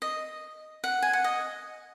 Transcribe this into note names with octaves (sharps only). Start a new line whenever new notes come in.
D#5
F#5
G#5
F#5
D#5